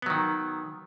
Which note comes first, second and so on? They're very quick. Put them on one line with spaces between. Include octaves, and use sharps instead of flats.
B3 F#3 D#3